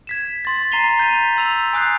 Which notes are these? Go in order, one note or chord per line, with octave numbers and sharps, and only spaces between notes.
G#6 B6 E7
C6 A6
A#5 C7 D#7 F7 G7
G6 A6 B6 D#7 F7
C6 E6 F7
G#5 D#6 F#6 G6 C7